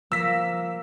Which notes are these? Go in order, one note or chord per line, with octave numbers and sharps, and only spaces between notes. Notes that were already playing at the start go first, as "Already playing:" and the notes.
F3 A#3 E6 B6